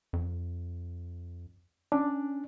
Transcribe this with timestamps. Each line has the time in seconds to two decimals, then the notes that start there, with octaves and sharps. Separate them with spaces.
0.13 F2
1.92 C#4 D4